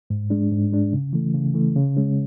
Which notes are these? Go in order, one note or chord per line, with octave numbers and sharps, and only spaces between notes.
G#2
G#3 D4
G#2
G#3 D4
C#3
E3 A3
C#3
E3 A3
C#3
G#3 C#4